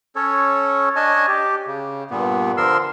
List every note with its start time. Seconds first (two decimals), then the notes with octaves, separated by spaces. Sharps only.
0.16 C#4 A4 C#5
0.96 D4 C#5 D#5 G#5 A5
1.28 G4
1.67 C#3
2.11 G2 A#2 B3
2.57 D3 F3 A#4 C6 E6